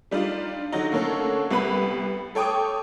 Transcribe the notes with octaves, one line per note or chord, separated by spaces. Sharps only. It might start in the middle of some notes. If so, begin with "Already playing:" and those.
G3 D4 D#4 F4
D3 F#3 D#4
D3 A3 A#3 C#4 A4
C2 B3 B4 B5
A4 C#5 G5 D6 D#6